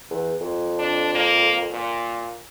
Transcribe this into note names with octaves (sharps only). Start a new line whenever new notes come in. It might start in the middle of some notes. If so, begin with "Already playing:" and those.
E2
F2
D4
A#3
A#2